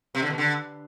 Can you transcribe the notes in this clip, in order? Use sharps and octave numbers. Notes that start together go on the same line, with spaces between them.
C3
D3
B2
D3